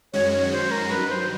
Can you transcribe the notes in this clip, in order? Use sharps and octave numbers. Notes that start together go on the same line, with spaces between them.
F#2 D#3 G#3 C#4 F#4 C#5
C#5
C5
A#4
G2 D#3 F#3 B4
C5